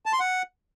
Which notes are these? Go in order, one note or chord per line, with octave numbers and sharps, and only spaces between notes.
A5
C6
F#5